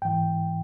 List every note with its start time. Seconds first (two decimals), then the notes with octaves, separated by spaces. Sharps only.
0.02 G#2 E3 G5